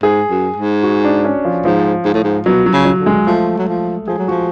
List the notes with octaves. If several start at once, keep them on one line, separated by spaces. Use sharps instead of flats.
G#2 G#4
F#2
G#2
F#4
D4
C#4
F3
G#2 F3
G#2
A2
G#2
B2 F#3
F#3
C#3
F#3
D3
G#3
F3 A3
F#3
F3
F3 G#4
F#3
F3 F#4